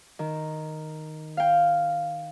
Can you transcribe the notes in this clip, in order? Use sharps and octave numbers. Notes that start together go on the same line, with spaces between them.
D#3
F5 G5